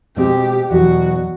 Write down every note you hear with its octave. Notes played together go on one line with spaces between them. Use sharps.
B2 G#3 C4 G4
E2 B2 F#3 F#4